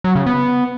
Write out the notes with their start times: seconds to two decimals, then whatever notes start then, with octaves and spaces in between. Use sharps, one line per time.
0.04 F#3
0.15 C#3
0.26 B3